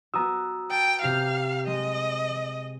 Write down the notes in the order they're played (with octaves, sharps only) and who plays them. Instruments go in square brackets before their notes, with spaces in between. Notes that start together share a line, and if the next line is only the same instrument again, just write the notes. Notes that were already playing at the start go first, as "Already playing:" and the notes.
[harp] B3 F#4 [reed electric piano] A#5 D#6 E6
[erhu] G5 [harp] A5
[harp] C3 G4 A#6 [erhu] F5
[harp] G#3 [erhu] D#5